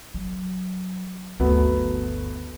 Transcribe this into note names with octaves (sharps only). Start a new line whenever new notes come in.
F#3
G1 D2 F#3 A3 B3